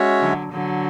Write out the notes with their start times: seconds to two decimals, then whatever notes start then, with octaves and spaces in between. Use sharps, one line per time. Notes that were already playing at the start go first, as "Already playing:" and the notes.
Already playing: G#3 C#4 F#4 C#5 E5
0.20 D3 F#3
0.52 D3 F#3